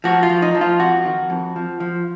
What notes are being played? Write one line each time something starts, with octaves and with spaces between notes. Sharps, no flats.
F3 F#4
F4
F3
D#4
F3
F4
F2 F#4
D#3
F2
F3
F3